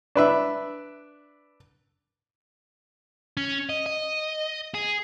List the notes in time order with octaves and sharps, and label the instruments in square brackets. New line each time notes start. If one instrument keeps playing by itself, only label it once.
[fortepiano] D4 B4 E5
[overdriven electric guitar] C#4
D#5
D#5
G#4